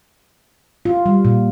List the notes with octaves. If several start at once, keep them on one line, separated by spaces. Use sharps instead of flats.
F4
G3
A#2